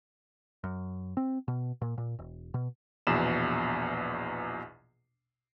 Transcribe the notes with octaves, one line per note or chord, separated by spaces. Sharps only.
F#2
C4
B2
A#2
A#2
E1
B2
A#1 E2 B2 E7